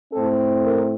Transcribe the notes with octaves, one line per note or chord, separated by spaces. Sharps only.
A2 A3 C4 A4
A#4